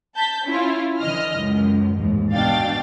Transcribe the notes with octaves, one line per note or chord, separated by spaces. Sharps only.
A5 G6 B6
C#4 E4 F4
D3 E3 D#5 F6
C#2 F#2
A1 D#2 G#2
B2 D4 F5 G5 A6